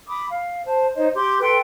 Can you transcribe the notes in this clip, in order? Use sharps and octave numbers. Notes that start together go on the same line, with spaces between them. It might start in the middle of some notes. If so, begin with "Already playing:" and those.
B5 D6 D#6
F5
C5 A5
D#4 C5 C#5 D#5
G4 C6 D6 G6
A4 B4 G5 C6